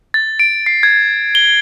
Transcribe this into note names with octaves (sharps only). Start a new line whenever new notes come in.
A6
D7
C7
G#6
G7